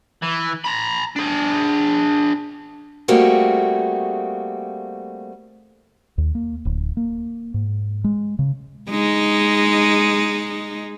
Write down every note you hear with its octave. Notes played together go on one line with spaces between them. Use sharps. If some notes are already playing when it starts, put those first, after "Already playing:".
E3
A#5 B5
D4 G#4
G3 A3 A#3 C4 F#4 G#4
D#2
A#3
D1
A#3
G#2
G#3
C#3
G#3 D#4